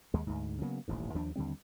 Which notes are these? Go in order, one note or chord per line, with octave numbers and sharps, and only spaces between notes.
D#2 G#3
D2 G#2
C#3 F#3 A#3 B3
D#1 A1 G#2
D#2 F3 D4
D#2 D3 G3 C4